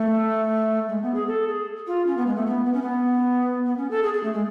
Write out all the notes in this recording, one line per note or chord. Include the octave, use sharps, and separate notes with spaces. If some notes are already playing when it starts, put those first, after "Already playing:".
Already playing: A3
G#3
B3
G#4
A4
G#4
F4
C#4
B3
G#3
A3
B3
B3
C#4
B3
B3
C#4
A4
G#4
G#4
A3
G#3